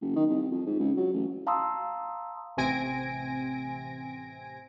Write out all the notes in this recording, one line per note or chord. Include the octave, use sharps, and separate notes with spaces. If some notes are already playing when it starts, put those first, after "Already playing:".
F#1
D#3
C2
F2
G#2
C#2
F#3
A1
F5 A5 A#5 C6 D#6 E6
A1 C3 C4 G#5 A#6 D7